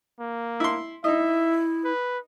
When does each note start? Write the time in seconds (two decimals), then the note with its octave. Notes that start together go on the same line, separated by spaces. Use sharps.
0.20 A#3
0.60 E4 C6
1.04 D#4 E4 D#5 E5
1.84 B4